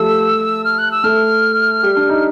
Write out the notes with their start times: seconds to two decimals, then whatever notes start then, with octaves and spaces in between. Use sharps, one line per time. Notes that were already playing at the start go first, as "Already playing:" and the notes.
Already playing: F3 G3 A3 G4 A4 E6
0.65 F6
0.79 F#6
0.92 E6
1.04 A3 A4 F6
1.83 G3 G4
1.97 D4
2.09 D#4